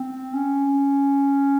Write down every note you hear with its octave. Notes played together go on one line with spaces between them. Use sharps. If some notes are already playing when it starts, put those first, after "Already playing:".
Already playing: C4
C#4